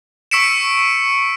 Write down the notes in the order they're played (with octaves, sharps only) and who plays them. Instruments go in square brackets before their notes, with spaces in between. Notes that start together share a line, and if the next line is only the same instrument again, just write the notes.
[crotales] C#6 E6 B6 C#7 D7 E7